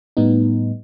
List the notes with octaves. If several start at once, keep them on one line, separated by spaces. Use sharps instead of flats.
A2 G3 B3 D#4